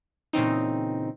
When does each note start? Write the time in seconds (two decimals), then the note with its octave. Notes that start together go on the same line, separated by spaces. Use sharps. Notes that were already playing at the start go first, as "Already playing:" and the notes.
0.33 A#2 C#3 E3 C4 D#4